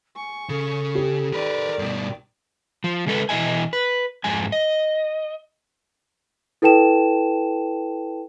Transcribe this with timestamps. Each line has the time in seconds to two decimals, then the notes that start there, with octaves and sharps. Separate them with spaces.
0.16 G#5 C#6
0.49 C#3 A4
0.95 G4
1.33 D#3 A#4 B4 D5
1.79 G2 B2
2.84 F3
3.06 C#3 G#3 A4 B4
3.29 B2 E3 G#3 D#5 E5 G#5
3.73 B4
4.24 F2 G#2 G#5
4.52 D#5
6.62 E4 A4 B4 G5 A5 E7